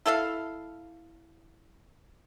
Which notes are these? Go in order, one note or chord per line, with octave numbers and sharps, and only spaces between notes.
E4 A4 E5 F5